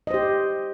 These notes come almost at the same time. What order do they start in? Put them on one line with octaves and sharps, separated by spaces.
D#5 C5 G4